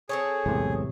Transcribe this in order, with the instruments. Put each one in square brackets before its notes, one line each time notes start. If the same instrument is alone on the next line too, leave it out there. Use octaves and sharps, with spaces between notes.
[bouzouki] C4 A4 C#5 [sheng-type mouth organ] G#4
[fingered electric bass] B1 E2 G#3 [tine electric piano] A2 C3